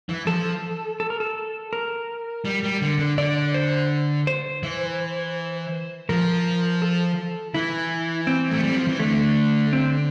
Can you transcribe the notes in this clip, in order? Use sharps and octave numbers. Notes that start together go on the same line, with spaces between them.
E3
F3 A4
A4
A#4
A4
A#4
G3
G3
D3
D3
D3 D5
C5
C5
E3
F3 A#4
A4
E3 E4
C4
A3
G3
F3
E3
D3 A3
C4